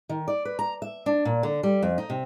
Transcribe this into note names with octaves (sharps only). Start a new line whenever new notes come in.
D#3
D5
B4
A#5
E5
D4
A#2
D3
G3
F2
D#4
C3